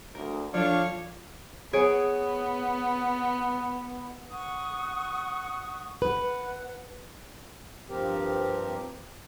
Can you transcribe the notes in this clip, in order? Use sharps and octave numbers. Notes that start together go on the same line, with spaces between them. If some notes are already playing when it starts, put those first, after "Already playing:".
D2 A#4
F3 D4 F4 A4 C#5 D5 F5 C#6
B3 G#4 C#5 D7
F#5 C#6 D#6
B4 F#5
G2 F3 C4 G4 A#4